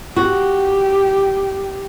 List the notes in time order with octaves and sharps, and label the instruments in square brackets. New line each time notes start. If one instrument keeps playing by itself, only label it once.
[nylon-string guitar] F#4 [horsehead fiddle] G4